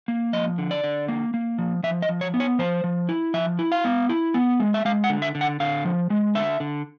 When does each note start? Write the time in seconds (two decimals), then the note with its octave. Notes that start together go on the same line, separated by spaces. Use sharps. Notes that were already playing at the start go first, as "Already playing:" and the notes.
0.08 A#3
0.33 F3 D#5
0.58 D3
0.71 D5
0.84 D3
1.08 A#3
1.34 A#3
1.58 F3
1.83 F3 E5
2.02 D#5
2.09 F3
2.21 C#5
2.34 B3
2.40 C#5
2.59 F3 C5
2.84 F3
3.09 E4
3.34 F3 E5
3.59 E4
3.72 F5
3.84 B3
4.09 E4
4.34 B3
4.60 G#3
4.74 E5
4.85 G#3 F5
5.04 F#5
5.09 D3
5.22 E5
5.35 D3
5.41 F#5
5.60 D3 F5
5.85 F3
6.10 G#3
6.35 D3 E5
6.60 D3